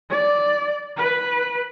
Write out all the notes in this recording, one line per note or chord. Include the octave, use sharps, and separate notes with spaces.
D5
B4